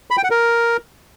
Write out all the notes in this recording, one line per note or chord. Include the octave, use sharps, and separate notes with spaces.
B5
G5
F#5
A#4